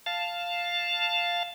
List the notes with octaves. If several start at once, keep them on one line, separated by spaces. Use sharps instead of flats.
F5 A5